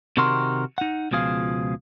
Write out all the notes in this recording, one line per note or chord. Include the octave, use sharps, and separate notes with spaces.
C3 D#3 C4 F#4 A#4 C6
D#4 F#5
C#2 B2 F3 G#4 F5